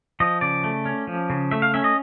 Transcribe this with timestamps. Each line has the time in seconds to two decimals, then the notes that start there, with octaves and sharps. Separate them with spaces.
0.20 F3 D#5
0.41 C#3 D5
0.64 A3
0.85 C#4
1.07 F3
1.30 C#3
1.51 A3 E5
1.62 F5
1.74 C#4 E5
1.84 D#5